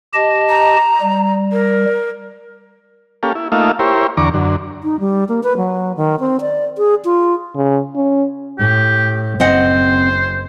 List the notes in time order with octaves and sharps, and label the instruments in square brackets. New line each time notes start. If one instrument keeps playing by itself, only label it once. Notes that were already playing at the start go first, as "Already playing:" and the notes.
[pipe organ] G4 D#5 A5
[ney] A#5
[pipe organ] G3
[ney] A#4
[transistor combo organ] A#3 C#4 G4 A4 F5
E4
A3 A#3 D#4 F4 E5 F5
E4 G4 A#4 C5 C#5
E2 D3 A#5 C#6 D6
F#2 D3
[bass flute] D#4
G3
A#3
B4
F#3
D#3
C4
D5
G#4
F4
[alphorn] C#3
C#4
[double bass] A2 [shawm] G4
[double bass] F#1 [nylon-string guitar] C4 D#5 F#5 [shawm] C5